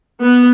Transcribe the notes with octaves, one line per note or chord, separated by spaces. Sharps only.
B3